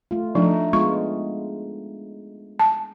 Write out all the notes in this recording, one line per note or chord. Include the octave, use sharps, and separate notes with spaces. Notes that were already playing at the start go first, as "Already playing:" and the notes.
A3 F4
F3 A3 D4 D#4
G#3 B3 F4 C#6
A5